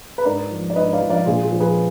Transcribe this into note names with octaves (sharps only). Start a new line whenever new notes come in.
B4
G#2 A#4 D5
F3
D5
G#2 B4 D#5
D5 F5
F3
D5 F5
A#2 F4 G#4
F4 G#4
F3
G#4 B4